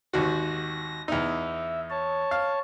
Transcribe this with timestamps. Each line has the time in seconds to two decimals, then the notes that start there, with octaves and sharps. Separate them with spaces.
0.13 G#1 D#2 F#4 A#6
1.08 E2 D#4 E5
1.90 C#5 A5
2.31 F5